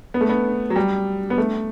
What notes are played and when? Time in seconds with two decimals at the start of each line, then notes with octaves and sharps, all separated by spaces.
0.14 B3
0.21 A3
0.29 B3
0.70 F#3
0.76 G3
1.30 B3
1.38 A3